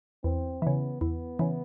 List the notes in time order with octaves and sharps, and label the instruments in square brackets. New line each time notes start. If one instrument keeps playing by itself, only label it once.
[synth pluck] E2 [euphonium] C4
[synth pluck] C#3 E3 [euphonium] B3
[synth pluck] E2 [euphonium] B3
[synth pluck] C#3 E3